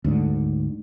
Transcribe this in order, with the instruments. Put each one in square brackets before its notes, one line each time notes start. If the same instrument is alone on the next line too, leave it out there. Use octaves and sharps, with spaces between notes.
[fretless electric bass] D2 G#2 D3